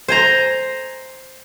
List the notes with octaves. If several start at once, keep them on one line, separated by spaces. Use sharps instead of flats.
C5 G#5 A#5